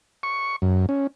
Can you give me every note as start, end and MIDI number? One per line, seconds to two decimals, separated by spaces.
0.23 0.56 85
0.62 0.86 42
0.89 1.07 61